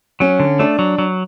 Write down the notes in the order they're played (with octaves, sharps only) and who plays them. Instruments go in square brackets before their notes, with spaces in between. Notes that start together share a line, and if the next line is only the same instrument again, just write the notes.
[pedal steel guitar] F#3 [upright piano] C#4
[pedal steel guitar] D3
[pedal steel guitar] A3 [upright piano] D4
[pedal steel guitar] F#3
F#3